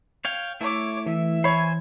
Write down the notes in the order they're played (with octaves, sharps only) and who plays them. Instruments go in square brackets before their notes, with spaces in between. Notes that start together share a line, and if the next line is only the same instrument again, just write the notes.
[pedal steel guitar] C#5 F5 G5
[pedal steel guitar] A3 E4 [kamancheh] C#5 D6
[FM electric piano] E3 [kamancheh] E5
[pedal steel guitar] C5 G#5 [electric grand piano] C#5 B5